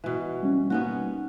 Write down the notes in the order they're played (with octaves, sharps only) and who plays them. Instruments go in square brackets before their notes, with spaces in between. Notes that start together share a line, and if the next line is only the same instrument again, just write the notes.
[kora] B2 E3
[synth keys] G3 C#4
[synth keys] G3 A#3 D#4 [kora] B3 C#4 F#4